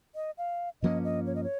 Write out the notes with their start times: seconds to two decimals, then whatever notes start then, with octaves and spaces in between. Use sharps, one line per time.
0.15 D#5
0.38 F5
0.82 G2 F3 A#3 C#4 D#5
1.04 D#5
1.26 C#5
1.35 D#5
1.44 C#5